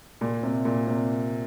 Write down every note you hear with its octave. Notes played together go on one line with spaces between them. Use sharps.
A#2
C3
A#2
C3